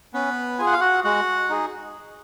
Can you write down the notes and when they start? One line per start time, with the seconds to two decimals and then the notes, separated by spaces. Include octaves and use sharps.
0.14 B3 C#4 B4
0.58 F4 G#4 G#5
0.66 F#5
0.73 F5
0.81 F#4 F#5
1.04 G#3 F#4 F#5
1.50 D#4 G#4